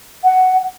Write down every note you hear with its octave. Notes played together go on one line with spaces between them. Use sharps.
F#5